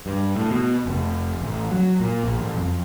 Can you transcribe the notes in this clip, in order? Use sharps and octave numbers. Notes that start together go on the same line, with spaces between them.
G2
A2
B2
F1
A1
F#3
A#2
A#1
A1
F2